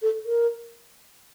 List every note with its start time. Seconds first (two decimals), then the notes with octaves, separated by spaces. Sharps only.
0.02 A4
0.26 A#4